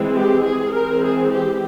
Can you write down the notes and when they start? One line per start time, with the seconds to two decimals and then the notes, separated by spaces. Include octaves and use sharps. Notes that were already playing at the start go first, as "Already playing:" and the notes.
Already playing: E3 G#3 C4
0.16 G4
0.44 G#4
0.73 E3 G#3 C4 A#4
1.02 G#4
1.31 G4